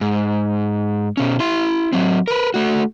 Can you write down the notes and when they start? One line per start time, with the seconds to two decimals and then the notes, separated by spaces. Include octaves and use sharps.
0.01 G#2
1.17 B2 C#4
1.40 E4 C6
1.93 F#3 C4
2.28 A#4 B4
2.54 A3 F#4